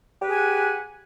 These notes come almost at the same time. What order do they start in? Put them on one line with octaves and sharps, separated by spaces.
G4 B4 G#4 G#5 F#5